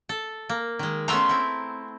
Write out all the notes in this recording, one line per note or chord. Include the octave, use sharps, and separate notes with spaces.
A4
A#3
D#3 G#3
A3 B3 C#4 A#5 C6 E6
C4 E4